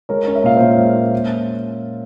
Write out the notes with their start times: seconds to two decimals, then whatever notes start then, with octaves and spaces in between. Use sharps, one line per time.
0.09 G#3 A#4 C#5
0.27 C#4
0.35 E5
0.44 A#2 F5
0.56 A#2 C5 E5
0.78 G#3
0.95 C#4
1.12 A#3